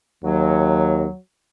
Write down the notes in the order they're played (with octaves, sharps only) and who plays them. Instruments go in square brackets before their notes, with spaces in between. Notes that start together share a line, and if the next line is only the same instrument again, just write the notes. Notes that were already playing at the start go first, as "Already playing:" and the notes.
[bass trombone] D#2 [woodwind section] F#3